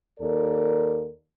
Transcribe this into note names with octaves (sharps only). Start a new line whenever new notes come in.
D#2 A4 A#4 D5